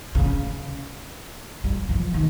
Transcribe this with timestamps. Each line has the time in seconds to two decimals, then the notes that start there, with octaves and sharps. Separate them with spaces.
0.15 C#3
1.64 G3
1.89 F3
2.14 D#3